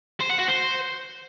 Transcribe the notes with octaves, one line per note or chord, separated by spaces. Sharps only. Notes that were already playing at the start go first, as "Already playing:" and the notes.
C5
F#5
F#4
C5